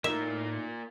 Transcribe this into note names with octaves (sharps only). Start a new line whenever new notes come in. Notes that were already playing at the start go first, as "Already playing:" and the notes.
A2 A#3 D#4 F4 A#4 E5